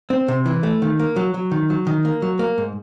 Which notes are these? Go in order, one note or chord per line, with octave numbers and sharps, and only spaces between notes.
C4
C3
E3
A3
D#3
A#3
F#3
F#3
D#3
F#3
D#3
A#3
F#3
A#3
G#2